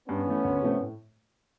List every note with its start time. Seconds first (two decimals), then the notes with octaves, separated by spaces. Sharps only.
0.08 G2 B3 C#4
0.27 E3 A3
0.44 D2
0.62 C3 F3 A3 C4
0.80 A2